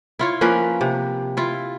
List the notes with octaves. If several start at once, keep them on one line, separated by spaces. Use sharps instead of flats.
E4 F4 C#5
F3 A#3 C#4 B4
C3
E4 F4